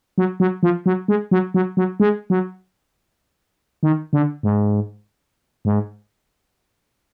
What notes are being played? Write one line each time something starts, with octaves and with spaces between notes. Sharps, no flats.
F#3
F#3
F3
F#3
G#3
F#3
F#3
F#3
G#3
F#3
D#3
D3
G#2
G#2